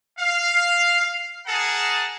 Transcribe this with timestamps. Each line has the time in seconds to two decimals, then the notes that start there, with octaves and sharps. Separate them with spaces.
0.19 F5
1.47 G#4 A#4 F#5 A5